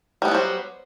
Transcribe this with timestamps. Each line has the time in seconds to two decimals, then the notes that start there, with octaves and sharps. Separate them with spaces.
0.22 G3
0.25 B3
0.28 E4
0.31 F#3
0.35 C5